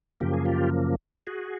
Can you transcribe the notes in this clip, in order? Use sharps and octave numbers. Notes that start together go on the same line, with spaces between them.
F#2 C#3 F3 A#3 G4
G#4
F4 G4
F#4 G#4